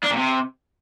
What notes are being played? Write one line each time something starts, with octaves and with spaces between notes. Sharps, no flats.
D4
A#2
C3